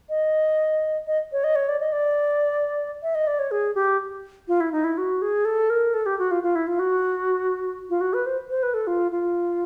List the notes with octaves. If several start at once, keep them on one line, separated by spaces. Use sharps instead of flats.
D#5
D#5
C#5
D#5
C#5
D5
D#5
D5
E5
D#5
D5
C#5
G#4
G4
F4
E4
D#4
E4
F#4
G#4
A4
A#4
A4
G4
F#4
F4
F4
E4
F4
F#4
F4
F#4
B4
C5
C5
B4
A4
F4
F4